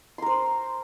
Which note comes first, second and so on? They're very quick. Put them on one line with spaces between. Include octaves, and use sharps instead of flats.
C6 A#4 C5